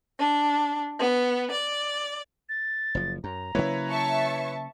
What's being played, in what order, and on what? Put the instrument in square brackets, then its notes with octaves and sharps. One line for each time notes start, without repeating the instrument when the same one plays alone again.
[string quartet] D4
B3
D5
[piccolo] A6
[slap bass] F#1 F3
[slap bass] F#2 [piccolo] A#5
[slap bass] C#3 F#3 A#3 [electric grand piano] E4 B4 C#5
[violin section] E5 A5 C#6